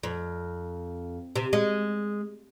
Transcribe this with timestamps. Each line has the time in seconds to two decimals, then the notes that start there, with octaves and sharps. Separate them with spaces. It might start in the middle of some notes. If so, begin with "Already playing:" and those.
0.03 F2
1.36 C3
1.53 G#3